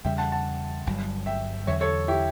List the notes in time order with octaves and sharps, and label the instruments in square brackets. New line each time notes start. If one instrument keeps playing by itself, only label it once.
[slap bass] E2 C#3 G3 [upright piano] E5 G5
[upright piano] F#5 A5
F#5 A5
[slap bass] G1 G2 F#3
[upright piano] E5 G5
[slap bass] E2 D3 F#3 [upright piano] C#5 E5
[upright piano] A4 C#5
E4 G4